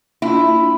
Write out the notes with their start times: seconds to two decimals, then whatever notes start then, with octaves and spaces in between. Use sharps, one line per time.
0.22 A#3 D4 E4 F4